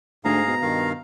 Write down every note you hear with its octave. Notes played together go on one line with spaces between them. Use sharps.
D2 G#2 G#4 F5 A#5
B2
G2 D#3 F5